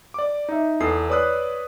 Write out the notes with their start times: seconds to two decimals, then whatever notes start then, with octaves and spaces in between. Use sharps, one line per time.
0.14 D5 D6
0.49 D#4 E5
0.80 E2 E3 A4 D#6 C7
1.09 B4 C#5 D5 D#6 E6 F#6